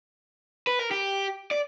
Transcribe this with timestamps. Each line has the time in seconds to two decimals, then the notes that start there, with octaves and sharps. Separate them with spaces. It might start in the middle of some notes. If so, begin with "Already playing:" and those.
0.67 B4
0.79 A#4
0.91 G4
1.51 D5